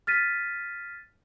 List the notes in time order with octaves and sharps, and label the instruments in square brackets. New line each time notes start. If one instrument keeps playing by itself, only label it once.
[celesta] F6 A6 B6 D#7